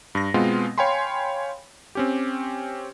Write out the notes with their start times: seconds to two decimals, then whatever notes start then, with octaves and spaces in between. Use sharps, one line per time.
0.15 G2 A#6
0.34 B2 G#3 B3 C4 F4
0.78 C#5 F5 G5 G#5 B5 C6
1.95 C4 C#4 G4